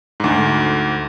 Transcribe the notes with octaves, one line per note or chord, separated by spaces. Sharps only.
D2 G#2